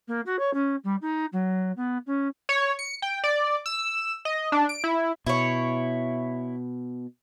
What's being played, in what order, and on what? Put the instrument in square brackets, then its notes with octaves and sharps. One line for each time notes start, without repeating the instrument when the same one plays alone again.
[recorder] A#3
F#4
C#5
C#4
G3
D#4
F#3
B3
C#4
[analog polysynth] C#5
C#7
G5
D5
E6
D#5
D4
D7
E4
[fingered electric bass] B2 [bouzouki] E4 C#5